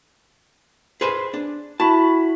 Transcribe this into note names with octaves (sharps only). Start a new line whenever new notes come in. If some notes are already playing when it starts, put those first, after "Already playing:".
G#4 B4 C5
D4
E4 F#4 A5 B5